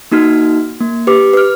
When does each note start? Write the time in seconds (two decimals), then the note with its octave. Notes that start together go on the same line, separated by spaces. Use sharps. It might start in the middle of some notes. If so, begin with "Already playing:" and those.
0.12 A#3 D#4 F#4 F6
0.81 A#3
1.07 G4 B4 D6
1.33 B4 F6